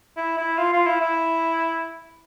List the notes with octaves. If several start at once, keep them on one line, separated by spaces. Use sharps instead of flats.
E4
E4
F4
F4
E4
E4